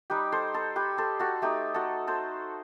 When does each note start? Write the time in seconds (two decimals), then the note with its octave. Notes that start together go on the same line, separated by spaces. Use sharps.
0.10 G3 D#4 G4 B4
0.32 A4 C5
0.54 A4 C5
0.76 G4 B4
0.97 A4 C5
1.19 F#4 A4
1.42 A3 D#4 G4
1.74 F#4 A4
2.07 A4 C5